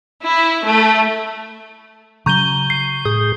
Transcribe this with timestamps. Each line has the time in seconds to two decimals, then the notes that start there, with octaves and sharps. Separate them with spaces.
0.23 E4
0.65 A3
2.26 C#3 F#3 A#5 C#6 G6 D#7 G7
2.70 C7
3.05 A2 G#4 D#6 G6